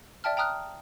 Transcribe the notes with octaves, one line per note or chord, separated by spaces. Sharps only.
D5 E5 G5 A5 F6
G5 A#5 D#6 F6 F#6